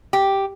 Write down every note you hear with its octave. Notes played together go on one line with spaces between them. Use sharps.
G4